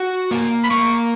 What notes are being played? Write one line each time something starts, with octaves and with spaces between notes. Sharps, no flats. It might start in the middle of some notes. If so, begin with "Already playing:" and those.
Already playing: F#4
A#3
B5
A#3 C#6